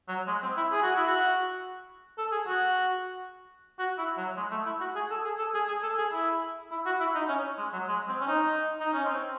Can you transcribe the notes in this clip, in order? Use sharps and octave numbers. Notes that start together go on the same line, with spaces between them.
F#3
G#3
C4
E4
G#4
F#4
E4
F#4
A4
G#4
F#4
F#4
E4
F#3
G#3
A3
E4
F#4
G#4
A4
G#4
A4
G#4
G#4
A4
G#4
E4
E4
F#4
E4
D#4
C#4
G#3
F#3
G#3
C4
C#4
D#4
D#4
C#4
C4